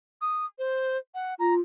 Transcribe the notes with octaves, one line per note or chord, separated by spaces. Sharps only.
D#6
C5
F#5
F4 A#5